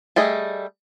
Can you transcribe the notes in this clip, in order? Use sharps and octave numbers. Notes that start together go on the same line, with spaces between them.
G3 A3 G#4 D#5